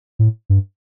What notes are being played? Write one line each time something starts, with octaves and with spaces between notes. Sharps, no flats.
A2
G2